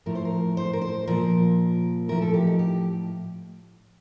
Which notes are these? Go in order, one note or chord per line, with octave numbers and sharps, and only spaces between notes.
A2 F3 A#4
C5
A#4
C5
A#4
C5
A#2 F3 A#4
A2 F3 A#4
A4
G4
D#4
G4